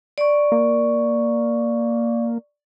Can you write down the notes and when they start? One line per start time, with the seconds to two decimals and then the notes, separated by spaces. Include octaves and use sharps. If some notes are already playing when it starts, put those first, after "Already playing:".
0.18 D5 C#6
0.52 A#3